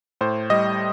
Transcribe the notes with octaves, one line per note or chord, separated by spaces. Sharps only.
A2 C5
G3 D#5